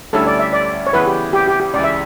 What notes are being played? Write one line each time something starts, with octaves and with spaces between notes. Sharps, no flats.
D2 D3 G3 C#4 E4 A4
D5
E5
D5
C#5
C#3 E3 B3 E4 B4
G4
G4
G4
G4
C#2 C#3 E3 D5
E5